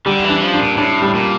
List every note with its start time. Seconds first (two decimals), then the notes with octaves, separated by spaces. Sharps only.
0.06 D3 G3
0.24 E3
0.29 D4
0.42 F3
0.54 D4
0.59 A#2
0.78 A2 D4
1.02 G3
1.14 A#2